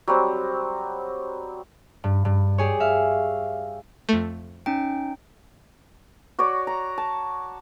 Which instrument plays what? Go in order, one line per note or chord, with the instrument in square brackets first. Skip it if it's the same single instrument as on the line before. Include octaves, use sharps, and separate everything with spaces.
[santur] F#3 G3 C4
[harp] G2
G2
G4 G#4 C#5
E5 F5
[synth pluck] F2 A3
[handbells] C#4 D#4 G5
[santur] F#4 C#5 D5
A#5
A5